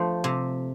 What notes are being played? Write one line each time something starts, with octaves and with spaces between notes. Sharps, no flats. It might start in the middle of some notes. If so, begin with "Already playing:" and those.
Already playing: F3 A3 C5
C3